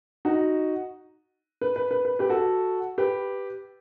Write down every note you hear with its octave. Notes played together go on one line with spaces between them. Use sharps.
D#4 F#4
B4
B4
B4
B4
G4 B4
F#4 A4
G4 B4